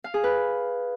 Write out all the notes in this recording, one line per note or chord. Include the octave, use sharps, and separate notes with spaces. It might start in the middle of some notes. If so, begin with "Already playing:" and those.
F5
G#4
B4